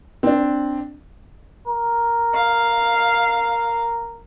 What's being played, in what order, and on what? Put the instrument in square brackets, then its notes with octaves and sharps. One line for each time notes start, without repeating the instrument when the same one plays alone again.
[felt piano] C4 D4
[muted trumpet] A#4
[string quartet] F5